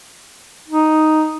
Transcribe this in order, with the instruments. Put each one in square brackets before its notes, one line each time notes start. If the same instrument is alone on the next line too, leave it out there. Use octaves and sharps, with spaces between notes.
[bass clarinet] D#4